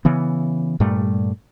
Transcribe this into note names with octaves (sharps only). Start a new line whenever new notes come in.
C#3 E3 B3
G2 A#2 G3 A3